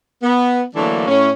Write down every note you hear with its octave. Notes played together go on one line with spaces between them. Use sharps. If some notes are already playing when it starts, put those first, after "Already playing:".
B3
D3 E3 F#3 A3 A#3 D4
A2 C#4